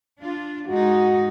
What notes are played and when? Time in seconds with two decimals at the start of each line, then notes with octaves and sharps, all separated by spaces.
0.18 D4 F4
0.68 G#2 G#3 D#4 F#4